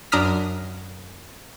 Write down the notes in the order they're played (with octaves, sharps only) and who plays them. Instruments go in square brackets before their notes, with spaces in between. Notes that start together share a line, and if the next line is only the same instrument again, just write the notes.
[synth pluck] F#2 D4 A#5 D#6 F6 B6